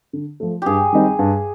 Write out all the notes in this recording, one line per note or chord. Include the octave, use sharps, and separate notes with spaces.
D3
F3 A3
G2 G4 G#4
D#3 G3 C4 D#4
G2